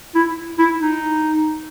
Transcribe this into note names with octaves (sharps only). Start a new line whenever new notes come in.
E4
E4
D#4